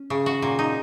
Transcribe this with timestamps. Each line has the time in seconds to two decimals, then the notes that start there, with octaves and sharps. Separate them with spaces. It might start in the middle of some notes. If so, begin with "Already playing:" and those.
Already playing: C#4
0.10 C#3
0.26 F#4
0.42 A#2
0.59 D#4